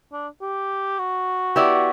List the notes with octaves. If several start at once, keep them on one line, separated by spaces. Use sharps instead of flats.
D4
G4
F#4
B3 E4 G4 D5